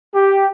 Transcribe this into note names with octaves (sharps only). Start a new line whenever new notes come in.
G4